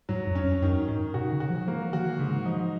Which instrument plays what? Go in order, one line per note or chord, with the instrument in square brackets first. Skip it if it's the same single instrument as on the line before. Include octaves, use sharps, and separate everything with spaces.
[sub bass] G#2 [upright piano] F#3
[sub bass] F#2
[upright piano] C#4
[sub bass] F2
[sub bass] F#2 [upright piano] D#3
[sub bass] G#2 [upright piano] D#3
[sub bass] B2 [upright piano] F#4
[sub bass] C#3
[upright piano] F#4
[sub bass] F3
[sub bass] F3 [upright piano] A#3
[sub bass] D#3 [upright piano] F#4
[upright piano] G#2 [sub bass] C#3
[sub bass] F3 [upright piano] D#4